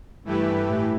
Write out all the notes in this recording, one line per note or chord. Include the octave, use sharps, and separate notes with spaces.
G2 E3 A3 E4 G4 B4
A2